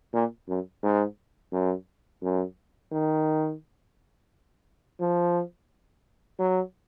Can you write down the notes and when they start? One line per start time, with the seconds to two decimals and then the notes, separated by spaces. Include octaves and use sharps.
0.14 A#2
0.49 F#2
0.83 G#2
1.53 F#2
2.22 F#2
2.92 D#3
5.01 F3
6.39 F#3